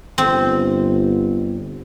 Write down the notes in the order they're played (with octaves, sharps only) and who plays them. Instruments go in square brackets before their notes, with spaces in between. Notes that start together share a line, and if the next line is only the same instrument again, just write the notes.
[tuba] G1 [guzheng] C4